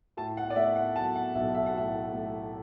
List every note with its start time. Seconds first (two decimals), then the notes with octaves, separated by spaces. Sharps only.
0.17 A2 A5
0.37 F#5
0.50 D5
0.56 A3 E5
0.76 F#5
0.96 F#3 A5
1.16 F#5
1.35 B1 E5
1.55 E5
1.66 F#5
1.74 A2 E5
2.13 A3